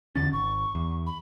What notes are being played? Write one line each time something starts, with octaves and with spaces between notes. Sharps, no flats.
E2 D3 C#4 A6
G#1 C#6
E2
B5